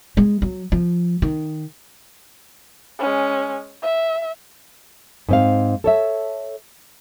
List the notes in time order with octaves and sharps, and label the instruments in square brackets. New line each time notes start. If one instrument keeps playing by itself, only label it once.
[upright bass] G#3
F#3
F3
D#3
[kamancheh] G#3 C#4
E5
[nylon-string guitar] G#2 C4 F5
A4 C#5 E5